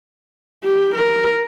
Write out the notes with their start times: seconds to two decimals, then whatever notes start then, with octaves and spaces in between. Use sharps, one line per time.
0.64 G4
0.95 A#4